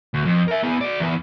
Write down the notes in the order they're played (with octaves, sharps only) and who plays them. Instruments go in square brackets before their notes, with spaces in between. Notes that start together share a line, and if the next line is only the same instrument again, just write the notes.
[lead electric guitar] D2
F2
A#4 E5
B3 G#4
F#4 D5
E2 B3